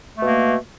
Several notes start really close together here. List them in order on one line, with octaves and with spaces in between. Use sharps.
A3 B2 A#3